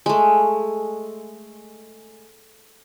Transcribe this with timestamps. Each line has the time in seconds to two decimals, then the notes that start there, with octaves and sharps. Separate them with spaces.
0.06 G#3 A3